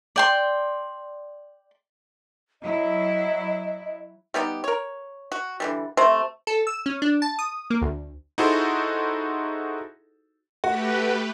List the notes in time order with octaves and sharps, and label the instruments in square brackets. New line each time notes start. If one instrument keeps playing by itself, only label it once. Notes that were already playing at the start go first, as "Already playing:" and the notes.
[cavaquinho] D5 G5 C6
[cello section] F#3 E4 [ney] D#5
[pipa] G3 B3 D#4 G4
A#4 C#5
F#4
D3 E3 G3
C3 A3 C5
[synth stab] A4
E6
C#4
D4
A5
D#6
A#3
D2
[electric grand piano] D#4 E4 F#4 G#4 A4 C5
[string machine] A3 G4 B4 [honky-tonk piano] F#4